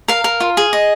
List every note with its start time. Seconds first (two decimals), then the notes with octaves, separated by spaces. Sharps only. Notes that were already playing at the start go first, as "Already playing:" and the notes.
0.08 A#4 F5
0.24 A#4
0.40 F4
0.57 G#4
0.73 D#5